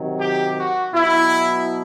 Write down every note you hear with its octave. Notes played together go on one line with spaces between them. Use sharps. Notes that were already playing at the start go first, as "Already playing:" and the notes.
Already playing: C3 D#3 F#3
G4
F#4
B2 F#3 E4